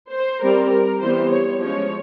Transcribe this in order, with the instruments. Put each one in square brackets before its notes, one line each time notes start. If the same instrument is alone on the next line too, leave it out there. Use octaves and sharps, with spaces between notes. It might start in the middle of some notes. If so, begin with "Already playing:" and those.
[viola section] C5
G3 C4 A#4
A#4
E3 G3 B3 C5
C#5
F3 G#3 C#4 C#5